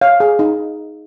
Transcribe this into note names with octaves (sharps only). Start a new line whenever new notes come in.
C#5 F5
G#4
D#4